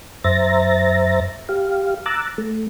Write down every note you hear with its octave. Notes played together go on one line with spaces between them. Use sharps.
F#2 C5 E5 A#5 A6 A#6
G4 F5
A#5 D6 E6 F#6 A6
A3